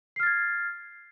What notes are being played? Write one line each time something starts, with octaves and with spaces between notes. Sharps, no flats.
F6 G#6 A6 C7